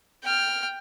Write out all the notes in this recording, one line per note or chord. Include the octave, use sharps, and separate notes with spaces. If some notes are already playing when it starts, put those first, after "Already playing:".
G5 F6